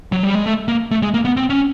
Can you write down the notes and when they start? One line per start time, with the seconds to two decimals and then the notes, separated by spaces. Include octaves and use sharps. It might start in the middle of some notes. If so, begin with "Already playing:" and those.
0.12 F#3
0.23 G3
0.35 G#3
0.46 A3
0.68 A#3
0.91 A3
1.02 G#3
1.14 A#3
1.25 B3
1.37 C4
1.50 C#4